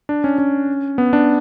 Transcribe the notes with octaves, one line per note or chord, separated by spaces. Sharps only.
D4
C#4
C#4
B3
D4